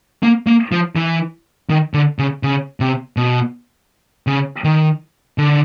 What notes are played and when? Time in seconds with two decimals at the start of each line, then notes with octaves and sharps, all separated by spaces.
0.23 A#3
0.47 A#3
0.72 F3
0.96 E3
1.70 D#3
1.94 D3
2.19 C#3
2.43 C#3
2.80 C3
3.17 B2
4.27 C#3
4.64 D#3
5.38 D3